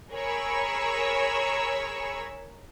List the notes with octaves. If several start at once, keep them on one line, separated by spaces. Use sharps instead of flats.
G#4 A#4 C#5 B5 C#6 E6